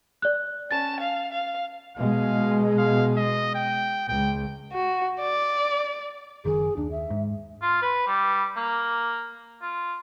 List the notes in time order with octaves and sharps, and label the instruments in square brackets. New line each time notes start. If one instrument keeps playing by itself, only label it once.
[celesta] D5 F#6
[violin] C#4 A5 [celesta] A6
[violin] F5
F5
[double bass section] B2 G#3 [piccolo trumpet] F5
[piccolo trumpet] F5
D#5
G5
[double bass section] C#2 [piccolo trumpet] G5
[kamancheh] F#4
D5
[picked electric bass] F#1 D#3 [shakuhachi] G#4
[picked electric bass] D#2 [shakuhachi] D4
[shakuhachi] E5
[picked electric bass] G#2
[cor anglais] F4
B4
G3
A#3
F4